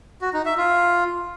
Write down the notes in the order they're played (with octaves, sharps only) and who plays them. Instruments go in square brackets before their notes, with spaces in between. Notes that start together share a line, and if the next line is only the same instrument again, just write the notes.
[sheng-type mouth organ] F#4
D#4
E5
F4